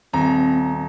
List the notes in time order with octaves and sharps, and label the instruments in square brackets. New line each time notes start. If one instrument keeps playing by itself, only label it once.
[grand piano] D#1 A#5 [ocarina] C4